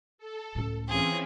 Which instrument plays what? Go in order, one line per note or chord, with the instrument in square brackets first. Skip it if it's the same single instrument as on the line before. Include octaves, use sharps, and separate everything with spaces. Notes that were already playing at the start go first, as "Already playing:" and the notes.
[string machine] A4
[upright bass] C#2 A2
[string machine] E3 C4 C#4 [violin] F4 G#4